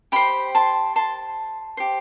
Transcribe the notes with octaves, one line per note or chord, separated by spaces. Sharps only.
G4 C5 G5 B5
A5 C6
A5 C6
G4 C5